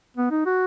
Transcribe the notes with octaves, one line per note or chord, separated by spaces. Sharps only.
B3
D#4
F#4